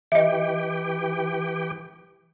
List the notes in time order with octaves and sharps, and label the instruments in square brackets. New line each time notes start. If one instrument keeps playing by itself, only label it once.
[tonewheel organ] E3 G4 G5 [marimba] D#5 E5